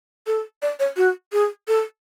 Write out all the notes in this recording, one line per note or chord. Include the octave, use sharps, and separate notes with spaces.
A4
D5
C#5
F#4
G#4
A4